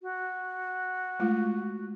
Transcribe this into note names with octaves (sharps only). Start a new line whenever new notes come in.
F#4
G#3 A3 F4